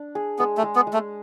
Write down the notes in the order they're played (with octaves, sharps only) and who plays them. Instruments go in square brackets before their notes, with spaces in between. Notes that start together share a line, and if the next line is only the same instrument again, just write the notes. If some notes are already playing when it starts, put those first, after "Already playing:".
Already playing: [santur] D4
G#4
[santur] G#3 [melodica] B3
[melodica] A3
[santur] G#3
[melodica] B3
[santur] G#3
[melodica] A3